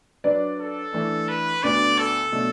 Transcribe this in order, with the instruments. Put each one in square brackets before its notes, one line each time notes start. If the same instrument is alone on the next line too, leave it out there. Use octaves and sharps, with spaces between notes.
[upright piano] F#3 D4 B4 D5
[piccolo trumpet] A4
[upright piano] E3 A3 D4
[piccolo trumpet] B4
[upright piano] D2 D3 B3 D4 F#4 [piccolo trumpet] D5
[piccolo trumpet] A4
[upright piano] B2 F#3 A3 D4